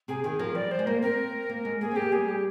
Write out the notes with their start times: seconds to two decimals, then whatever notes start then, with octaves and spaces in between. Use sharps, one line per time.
0.08 C3 G#4
0.24 D#3 G#4
0.39 F3 A#4
0.55 G3 D5
0.71 C5
0.79 G#3
0.86 A#3 A#4
1.02 C4 A#4
1.49 A#3
1.65 G#3
1.81 A#3 G#4
1.92 C4
1.96 G#3 G4
2.02 A#3
2.12 G3 G#4
2.28 G4